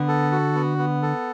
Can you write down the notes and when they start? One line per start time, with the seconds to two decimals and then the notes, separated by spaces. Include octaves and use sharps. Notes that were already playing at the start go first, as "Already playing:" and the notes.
Already playing: D3 B3
0.08 A4
0.32 F#4
0.55 B3
0.78 B3
1.02 A4